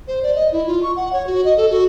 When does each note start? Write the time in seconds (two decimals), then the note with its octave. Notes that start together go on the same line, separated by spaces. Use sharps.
0.08 C5
0.23 D5
0.35 D#5
0.52 E4
0.67 F4
0.83 C#6
0.96 F#5
1.13 C#5
1.27 F#4
1.44 D#5
1.57 A4
1.70 F#4